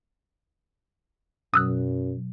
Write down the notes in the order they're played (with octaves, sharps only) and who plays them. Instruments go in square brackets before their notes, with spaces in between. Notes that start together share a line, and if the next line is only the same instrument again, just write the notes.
[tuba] F#2 [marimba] B2 F#3 [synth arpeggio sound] D#6 E6 F#6